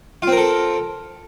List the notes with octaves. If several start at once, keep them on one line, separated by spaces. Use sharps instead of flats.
C4 F4 A4 A#4